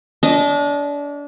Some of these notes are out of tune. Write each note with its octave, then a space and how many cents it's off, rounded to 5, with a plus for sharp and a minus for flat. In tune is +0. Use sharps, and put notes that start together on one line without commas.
D4 -30 D#5 +0